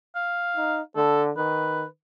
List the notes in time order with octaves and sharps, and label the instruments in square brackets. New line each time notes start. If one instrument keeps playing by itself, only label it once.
[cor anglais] F5
[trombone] D#4
[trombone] D3 [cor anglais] A4
[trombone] D#3 [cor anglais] B4